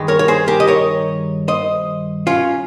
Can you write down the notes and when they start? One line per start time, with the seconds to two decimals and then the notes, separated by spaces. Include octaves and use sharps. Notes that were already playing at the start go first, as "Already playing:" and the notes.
Already playing: G2 D#3 G#3
0.08 A#4 C#5
0.19 C#5
0.28 G#4 C5
0.48 G4 A#4
0.60 D#5
0.67 A#4 C#5
1.48 C5 D#5
2.27 C#4 F4